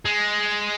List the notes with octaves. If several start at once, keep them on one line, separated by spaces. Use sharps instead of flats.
G#3